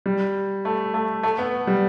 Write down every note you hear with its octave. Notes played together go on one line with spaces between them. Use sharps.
G3
A3
A3
A3
B3
G3